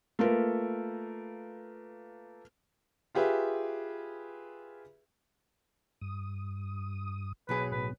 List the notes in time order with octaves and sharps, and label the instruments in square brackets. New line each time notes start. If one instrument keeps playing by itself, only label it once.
[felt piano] A3 A#3 F4 A#4 B4
[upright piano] F4 G4 G#4 B4 E5
[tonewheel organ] G2 D#6
[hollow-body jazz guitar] B1 F#3 G#4 [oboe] B4 [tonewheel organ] A#5
[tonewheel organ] A2 B3 [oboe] B4